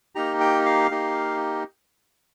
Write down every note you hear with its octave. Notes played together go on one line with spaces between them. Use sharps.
A#3 D#4 G4 A#5
G5
F5
A#3 D#4 G4